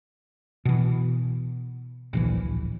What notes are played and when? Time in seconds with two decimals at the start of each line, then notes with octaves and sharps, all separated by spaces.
0.65 B2 E3
2.13 D1 A#1 E3